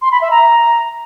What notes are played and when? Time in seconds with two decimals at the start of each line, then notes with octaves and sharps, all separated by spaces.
0.02 C6
0.12 B5
0.21 E5
0.31 A#5